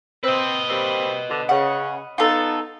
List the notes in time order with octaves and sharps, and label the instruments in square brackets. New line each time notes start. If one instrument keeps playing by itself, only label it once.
[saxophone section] C4 [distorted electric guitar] B4 D#5
[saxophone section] G3 A#3 C4
B2 D3
[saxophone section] C#3 [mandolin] F#5
[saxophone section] B3 D#4 [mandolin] F4 A4